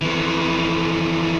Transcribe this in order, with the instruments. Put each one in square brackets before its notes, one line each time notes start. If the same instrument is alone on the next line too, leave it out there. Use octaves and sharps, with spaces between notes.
[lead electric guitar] F2 E3